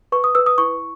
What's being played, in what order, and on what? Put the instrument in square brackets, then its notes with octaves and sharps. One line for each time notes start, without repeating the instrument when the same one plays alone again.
[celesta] B4 C#6
D#6
B4 E6
D#6
E4 C#6